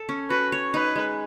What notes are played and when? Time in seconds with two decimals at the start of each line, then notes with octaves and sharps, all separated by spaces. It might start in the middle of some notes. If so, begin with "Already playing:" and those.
Already playing: A4
0.09 C#4
0.30 F#4 B4
0.52 C#5
0.74 D#4 B4
0.96 G#3